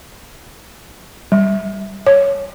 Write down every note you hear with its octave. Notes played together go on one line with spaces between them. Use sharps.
G3
C#5